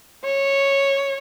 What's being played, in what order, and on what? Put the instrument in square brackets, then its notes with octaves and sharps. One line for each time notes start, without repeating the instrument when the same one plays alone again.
[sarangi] C#5